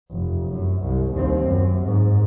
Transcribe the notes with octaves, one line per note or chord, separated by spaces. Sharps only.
F1
F#2
C2
D#2 C4
F#2
G#2